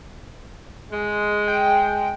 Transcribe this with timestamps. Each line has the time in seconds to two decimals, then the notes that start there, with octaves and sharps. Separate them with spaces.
0.92 G#3
1.48 G5